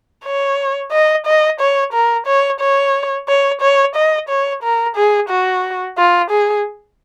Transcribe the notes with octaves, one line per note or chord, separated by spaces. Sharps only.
C#5
D#5
D#5
C#5
A#4
C#5
C#5
C#5
C#5
D#5
C#5
A#4
G#4
F#4
F4
G#4